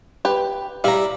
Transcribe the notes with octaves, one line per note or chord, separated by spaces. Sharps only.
G4 B4
G3 E4 F5 A#5